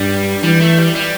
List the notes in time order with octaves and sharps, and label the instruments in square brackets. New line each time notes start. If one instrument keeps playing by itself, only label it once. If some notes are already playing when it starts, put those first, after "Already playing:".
Already playing: [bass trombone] G2 [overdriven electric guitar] G3
[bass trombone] E3 [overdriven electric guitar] G3
[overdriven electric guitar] A3
G3
G3